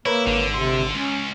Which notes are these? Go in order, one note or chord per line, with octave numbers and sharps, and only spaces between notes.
A#3 E4 A#4 B4 C#5
G#1 D3
C3 C6
C#2 C#4